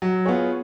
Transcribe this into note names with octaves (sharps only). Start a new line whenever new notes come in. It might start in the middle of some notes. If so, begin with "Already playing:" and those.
F#3
B3 F4 G#4 C#5